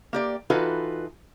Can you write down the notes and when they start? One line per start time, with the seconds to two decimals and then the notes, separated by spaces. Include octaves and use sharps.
0.13 A#3 G4 D5
0.50 E3 D#4 F4 F#4 A4 B4